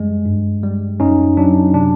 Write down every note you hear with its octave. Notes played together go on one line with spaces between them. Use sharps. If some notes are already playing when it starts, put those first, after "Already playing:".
Already playing: F#2 G3 G#3
G2
G3
F#2 C#4 D#4
F#3 D4
C3 D4